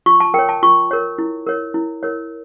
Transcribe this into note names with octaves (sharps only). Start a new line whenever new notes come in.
F4 C#6
A5
A#4 C#5 G5
A5
F4 C#6
A#4 C#5
E4
A#4 C#5
E4
A#4 C#5